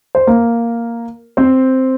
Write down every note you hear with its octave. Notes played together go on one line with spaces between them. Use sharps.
C5
A#3 A#4
C4 C5